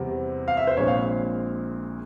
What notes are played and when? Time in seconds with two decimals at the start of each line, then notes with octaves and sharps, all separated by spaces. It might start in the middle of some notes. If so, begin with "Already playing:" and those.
Already playing: E2 C3 G3 C4
0.48 F5
0.57 E5
0.67 C5
0.77 A#1 A#2 G#3 C4 C#5
0.88 F5